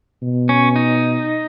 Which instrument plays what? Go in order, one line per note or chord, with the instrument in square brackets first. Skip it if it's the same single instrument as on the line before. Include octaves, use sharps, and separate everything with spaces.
[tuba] B2
[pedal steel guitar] C#4
D#4